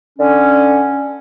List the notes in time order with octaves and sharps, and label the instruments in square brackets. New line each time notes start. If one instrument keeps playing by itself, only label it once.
[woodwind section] D3 C#4